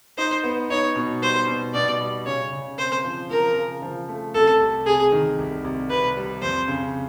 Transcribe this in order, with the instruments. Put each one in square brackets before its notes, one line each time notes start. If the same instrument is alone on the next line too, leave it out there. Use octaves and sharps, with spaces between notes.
[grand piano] D#4 [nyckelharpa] C5
[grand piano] B3
[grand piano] D#4 [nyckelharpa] C#5
[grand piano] B2
[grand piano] G3 [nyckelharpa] C5
[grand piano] B2
[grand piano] B2 [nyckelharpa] D5
[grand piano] G3
[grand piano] C#3 [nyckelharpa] C#5
[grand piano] C#3
[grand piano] C4 [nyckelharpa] C5
[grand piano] F3
[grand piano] F3 [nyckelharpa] A#4
[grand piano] C#3
F3
A3
[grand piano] C2 [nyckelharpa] A4
[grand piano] C2
[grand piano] C3 [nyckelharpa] G#4
[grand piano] D#3
C2
C2
[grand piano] C3 [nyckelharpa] B4
[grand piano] G3
[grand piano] F2 [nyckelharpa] C5
[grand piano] C#3